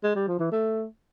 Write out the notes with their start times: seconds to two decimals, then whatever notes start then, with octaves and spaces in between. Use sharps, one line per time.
0.04 G#3
0.16 G3
0.28 F3
0.40 E3
0.52 A3